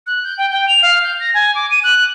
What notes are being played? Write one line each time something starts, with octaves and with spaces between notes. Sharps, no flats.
F#6
G6
G5
G5
F7
F5
G6
A#6
G#5
D6
D#7
F#6